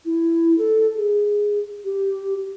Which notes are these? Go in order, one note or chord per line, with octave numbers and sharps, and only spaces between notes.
E4
A4
G#4
G4